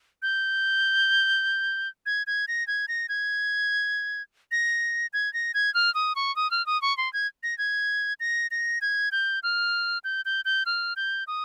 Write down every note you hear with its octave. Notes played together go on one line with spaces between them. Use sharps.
G6
G#6
G#6
A#6
G#6
A#6
G#6
A#6
G#6
A#6
G#6
F6
D#6
C#6
D#6
F6
D#6
C#6
C6
G#6
A#6
G#6
A#6
A#6
G#6
G6
F6
G6
G6
G6
F6
G6
D#6